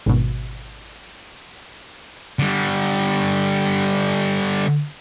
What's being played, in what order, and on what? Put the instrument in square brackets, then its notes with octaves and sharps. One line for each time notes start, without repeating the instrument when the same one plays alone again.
[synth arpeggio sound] G#1 B2
[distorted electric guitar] D3 G3